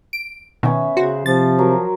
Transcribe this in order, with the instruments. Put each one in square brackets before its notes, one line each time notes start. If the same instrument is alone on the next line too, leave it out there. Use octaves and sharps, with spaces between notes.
[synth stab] D7
[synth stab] B2 D#3 [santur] B3 C#4 E5
[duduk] C#3 [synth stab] F#4 [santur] C5
[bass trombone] C3 [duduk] F3 [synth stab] A6
[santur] F#3 A#4